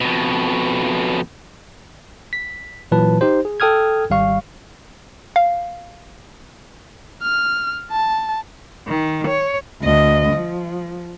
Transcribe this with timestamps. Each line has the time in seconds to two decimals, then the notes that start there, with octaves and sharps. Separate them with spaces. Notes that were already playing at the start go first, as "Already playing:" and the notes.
0.01 F2 B2
2.33 B6
2.91 A#2 E3 F#3 B4 A5
3.21 D#4 G4 C5
3.45 G#4
3.60 A4 G5 D#6 F6 G#6
4.10 G#1 G3 F5 C#6
5.36 F5
7.22 F6
7.91 A5
8.88 D#3
9.28 C#5
9.82 D2 D#5
10.33 F3